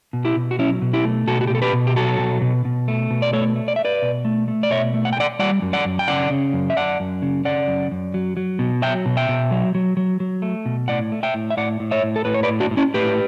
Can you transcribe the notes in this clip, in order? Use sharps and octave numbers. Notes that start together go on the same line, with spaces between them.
B2
E4 G4
B2
F#4
F#3 C#4 E4
B2
E4 G4
A3
B2 F#4 A4
F#4
G4
B2 A4
G4 B4
B2
G4
F#3 F#4 A4
B2
B2
B2
A3
B2
D5
A3 A4 C#5
A3
D5
A3 E5
B4 D5
B2
A3
A3
D5
B2 C#5 E5
A3
F#5
G5
A3
D5 F#5
G3 D5 F#5
F#2
D5 F#5
F#2
G5
C#3 D5 F#5
C#3
F#2
E5
F#2 D5 F#5
F#2
C#3
C#3 D5 F#5
F#2
F#2
F#3
F#3
B2
F#3 E5 G5
B2
E5 G5
B2
F#3
F#3
F#3
F#3
A3
B2
A2 D5 F#5
A3
E5 G5
A2
E5
A2 D5 F#5
A2
C#5 E5
A2
A4
A2 B4
C#5
B4 D5
A2
D4 F#4
A2
C#4 E4
A2 G4 B4